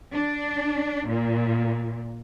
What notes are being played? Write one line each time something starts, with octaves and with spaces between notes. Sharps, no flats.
D4
A#2